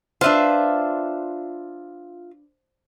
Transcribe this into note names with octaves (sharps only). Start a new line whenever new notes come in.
D4 F4 B4 C5 E5